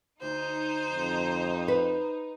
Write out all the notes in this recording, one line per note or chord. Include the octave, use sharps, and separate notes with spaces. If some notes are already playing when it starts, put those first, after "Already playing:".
D2 D#4 C5
F2
B4